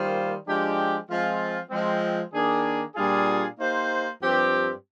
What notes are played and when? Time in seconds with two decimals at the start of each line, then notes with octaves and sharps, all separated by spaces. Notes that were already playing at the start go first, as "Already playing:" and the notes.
Already playing: D#3 G3 A#3 F4 C5
0.46 F3 G#3 D4 G4
1.08 F3 G#3 C4 F4
1.71 F3 G#3 C4
2.33 D#3 A#3 D4 G#4
2.96 A#2 G3 D4 F4 G#4
3.58 A#3 D#4 G4 C5
4.21 G2 F3 C4 G4